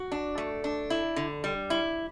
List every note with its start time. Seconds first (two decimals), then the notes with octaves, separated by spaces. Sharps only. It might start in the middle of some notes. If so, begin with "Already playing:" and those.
Already playing: F#4
0.12 D4
0.38 A3
0.64 D4
0.90 E4
1.16 D3
1.44 G3
1.70 E4